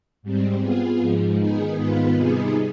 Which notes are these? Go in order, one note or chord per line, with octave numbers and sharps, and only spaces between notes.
G#2 G3 C4
B3 F4 G#4
G#2 F3 G#3
D#3 B3 D#4 G#4
G#2 D#3 B3 F4 B4
C3 G3 B3 D#4 G#4